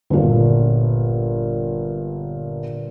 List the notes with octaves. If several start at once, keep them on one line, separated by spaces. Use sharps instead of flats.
G1 A#2